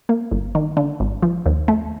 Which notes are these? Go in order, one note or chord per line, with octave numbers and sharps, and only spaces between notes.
A#3
G1
D#3
D3
G#1
F3
D#2
A3